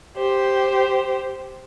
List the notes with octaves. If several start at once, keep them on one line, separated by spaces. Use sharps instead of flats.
G4 C5